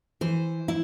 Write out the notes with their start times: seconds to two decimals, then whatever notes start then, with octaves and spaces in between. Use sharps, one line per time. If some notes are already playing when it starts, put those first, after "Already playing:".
0.21 E3 C5
0.68 E4